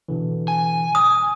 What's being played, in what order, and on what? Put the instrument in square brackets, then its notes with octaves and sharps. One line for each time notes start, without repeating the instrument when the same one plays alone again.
[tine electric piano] B2 D3 E3
[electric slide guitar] G#5
[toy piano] D#6